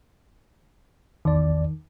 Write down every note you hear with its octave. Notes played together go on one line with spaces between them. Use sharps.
A1 E2 D#3 D5